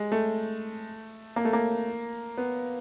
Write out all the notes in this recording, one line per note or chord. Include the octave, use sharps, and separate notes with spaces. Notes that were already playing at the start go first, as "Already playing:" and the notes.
Already playing: G#3
A3
A#3
A3
A#3
B3